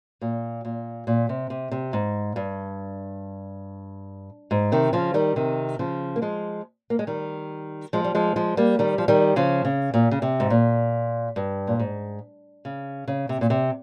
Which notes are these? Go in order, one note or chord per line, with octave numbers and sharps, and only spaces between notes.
A#2
A#2
A#2
C3
C3
C3
G#2
G2
G#2
C3 D#3
C#3 F3
D#3 G3
C3 D#3
C#3 F3
A#3
F3 G#3
A#3
G#3
D#3 G3
F3 G#3
G3
F3 G#3
F3 G#3
G3 A#3
D#3 G3
F3
D#3 G3
C#3 F3
C#3
A#2
C#3
C3
G#2
A#2
G2
A#2
G#2
C#3
C#3
C3
A#2
C3